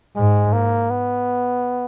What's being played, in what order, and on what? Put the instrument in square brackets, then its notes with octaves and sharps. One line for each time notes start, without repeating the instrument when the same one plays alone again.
[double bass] G#2 [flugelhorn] G#3
[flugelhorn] A#3
B3